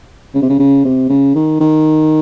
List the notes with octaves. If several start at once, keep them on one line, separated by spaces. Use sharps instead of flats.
C#3
C3
C#3
C#3
C3
C#3
D#3
D#3